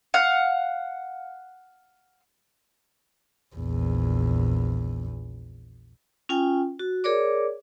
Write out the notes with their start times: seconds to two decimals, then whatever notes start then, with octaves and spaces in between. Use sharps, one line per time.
0.14 F5 F#5
3.55 A#1 E2
6.29 C#4 F4 G5 G#5
6.79 F#4
7.04 G#4 A#4 C#5 D5 D6